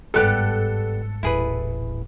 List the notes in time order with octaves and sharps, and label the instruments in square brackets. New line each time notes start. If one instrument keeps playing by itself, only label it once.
[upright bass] G1 G#2 [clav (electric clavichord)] G3 B3 G4 [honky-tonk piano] A4 F#6
[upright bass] D#1 A1 [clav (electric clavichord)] E4 G#4 B4